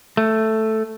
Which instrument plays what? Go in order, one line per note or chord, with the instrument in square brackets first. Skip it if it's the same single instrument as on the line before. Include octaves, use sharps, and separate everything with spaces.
[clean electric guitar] A3